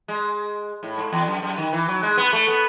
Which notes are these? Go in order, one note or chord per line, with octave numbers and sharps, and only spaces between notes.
G#3
A2
G#2
E2
F#2
F#2
D#3
E3
F#3
G#3
B3
A3
B3